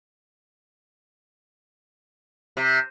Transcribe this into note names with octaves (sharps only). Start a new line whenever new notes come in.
C3